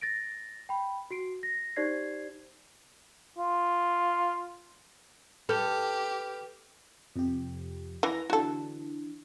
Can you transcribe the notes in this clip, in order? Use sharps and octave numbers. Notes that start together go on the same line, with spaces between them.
A6 A#6 D7
G5 B5
F#4 C7 D7
A#6
D#4 G4 C5 D5 G#6 C7
F4
G4 A4 B4 F6 G6
F2 C3 G4
E3 A#5 A#6
D3 E3 F#4 A4